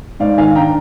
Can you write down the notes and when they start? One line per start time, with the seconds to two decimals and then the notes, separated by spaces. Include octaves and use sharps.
0.20 G#2 D5 F5
0.38 D#3 F5 G#5
0.55 D4 G5 A#5